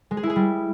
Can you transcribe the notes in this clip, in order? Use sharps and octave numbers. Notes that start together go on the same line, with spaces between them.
G#3
G#4
E4
G#4
G3